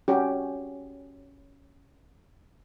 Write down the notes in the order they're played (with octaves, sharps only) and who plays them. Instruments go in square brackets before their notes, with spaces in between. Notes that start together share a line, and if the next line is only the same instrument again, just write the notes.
[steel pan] C#4 F#4 G4